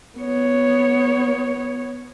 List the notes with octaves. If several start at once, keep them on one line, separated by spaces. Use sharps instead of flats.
B3 C#5